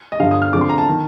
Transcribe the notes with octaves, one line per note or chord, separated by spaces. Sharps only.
D#5
G2 D3 F3 F5
D#6
F6
F2 D3 F3 D6
C6
A#5
A5
D#3